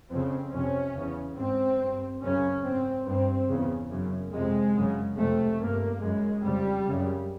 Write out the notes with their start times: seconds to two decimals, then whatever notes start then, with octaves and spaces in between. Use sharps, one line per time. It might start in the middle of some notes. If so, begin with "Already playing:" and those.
0.10 F2 C#3 C4
0.53 F2 C3 C#4
0.95 E2 C#3
1.37 G#2 C4
1.79 G2
2.21 F#2 C#3 C#4
2.64 G#2 C4
3.06 G2 C4
3.48 E2 C#3
3.91 F#2 C#3
4.32 F2 C3 G#3
4.75 F#2 C#3
5.17 F2 C3 A3
5.59 G2 A#3
6.01 F#2 C#3 G#3
6.44 F2 C#3 G3
6.87 F#2 C#3